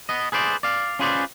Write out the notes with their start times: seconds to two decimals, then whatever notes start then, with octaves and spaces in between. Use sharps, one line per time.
0.09 B3 D#5
0.32 G#4 B4 C5 D5
0.63 D5 F5
0.99 C#4 F4 G#4 B4 C5 D5